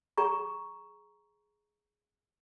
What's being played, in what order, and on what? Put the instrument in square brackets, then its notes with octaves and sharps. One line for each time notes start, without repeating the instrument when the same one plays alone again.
[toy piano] G#4 A#5 C#6